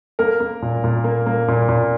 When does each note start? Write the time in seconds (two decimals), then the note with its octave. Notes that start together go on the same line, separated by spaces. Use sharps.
0.19 A#3 A#4
0.40 A#3
0.62 A#2
0.84 A#2
1.04 A#3
1.26 A#3
1.48 A#2
1.69 A#2